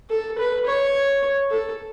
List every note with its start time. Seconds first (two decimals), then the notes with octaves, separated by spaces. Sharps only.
0.10 A4
0.38 B4
0.66 C#5
1.51 A4